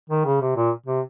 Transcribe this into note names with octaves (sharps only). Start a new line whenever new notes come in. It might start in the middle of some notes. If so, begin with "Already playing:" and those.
D#3
C#3
C3
A#2
C3